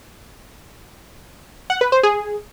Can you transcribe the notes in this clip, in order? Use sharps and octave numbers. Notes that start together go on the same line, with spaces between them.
F#5
B4
C5
G#4